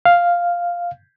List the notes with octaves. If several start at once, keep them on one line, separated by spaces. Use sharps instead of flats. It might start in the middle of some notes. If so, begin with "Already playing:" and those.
F5